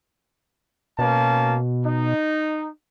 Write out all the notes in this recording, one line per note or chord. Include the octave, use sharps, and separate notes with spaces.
B2 A#3 C#4 A5
D#4